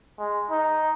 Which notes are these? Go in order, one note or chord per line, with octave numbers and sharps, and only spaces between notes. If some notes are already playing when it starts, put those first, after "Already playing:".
G#3
D#4